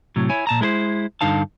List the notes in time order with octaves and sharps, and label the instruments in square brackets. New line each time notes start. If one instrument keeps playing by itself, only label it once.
[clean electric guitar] A2 C3 F#3
E4 C#5 G#5
A#2 A5 A#5
G#3 E4 A#4 C5
G2 D3 D#4 F5 A5